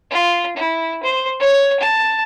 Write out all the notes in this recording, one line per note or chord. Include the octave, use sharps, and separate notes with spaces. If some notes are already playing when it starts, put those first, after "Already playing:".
F4
E4
C5
C#5
A5